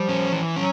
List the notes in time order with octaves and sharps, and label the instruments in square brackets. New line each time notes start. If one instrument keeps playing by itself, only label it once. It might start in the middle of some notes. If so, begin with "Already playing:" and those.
Already playing: [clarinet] F3 [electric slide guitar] G3
[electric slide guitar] C#4
E3
[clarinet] F#3 [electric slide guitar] C#4